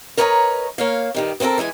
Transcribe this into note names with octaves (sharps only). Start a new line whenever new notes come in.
A#4 B4 C#5 D#5 G5 A#5
A#3 C#5 F5
G2 D#3 G3
B3 C4 F4 A4 A#4
E3 G#3 E4 G#5